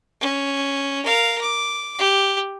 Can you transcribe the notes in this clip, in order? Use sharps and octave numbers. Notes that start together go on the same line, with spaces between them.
C#4
A#4 F5
D6
G4